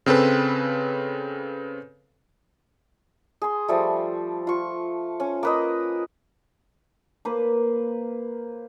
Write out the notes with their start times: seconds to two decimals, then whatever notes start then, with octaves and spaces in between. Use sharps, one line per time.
0.06 C#3 C4 A4 B4
3.42 G#4 C6
3.68 F3 G3 A3
4.47 F4 C#6
5.20 C#4
5.43 A#3 B4 D#5
7.25 A#3 B4 C5